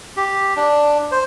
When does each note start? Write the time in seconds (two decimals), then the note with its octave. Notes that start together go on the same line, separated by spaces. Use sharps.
0.17 G4
0.56 D4
1.12 C5